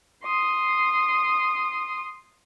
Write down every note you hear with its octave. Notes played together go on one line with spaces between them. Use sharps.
C6 D#6